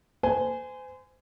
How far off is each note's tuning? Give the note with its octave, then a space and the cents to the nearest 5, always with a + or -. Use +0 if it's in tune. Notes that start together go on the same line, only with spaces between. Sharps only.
C5 -30 G#5 +0